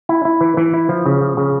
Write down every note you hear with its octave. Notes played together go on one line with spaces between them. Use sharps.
E4
E4
E3
E3
E4
F3
C#3
F3
C#3